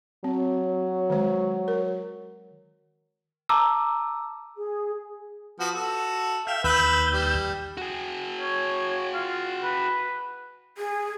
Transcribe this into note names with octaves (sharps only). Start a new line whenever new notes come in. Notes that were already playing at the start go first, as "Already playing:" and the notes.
F#3 C4
D#3 G#3 C5
A#4
A5 A#5 D6 E6
G#4
F3 B3 F#4
F#4 A4
E5 F5 G5
D#2 B4 B5 E6 G6
G3
F#4 G#4
C#5
F4
B4
G#4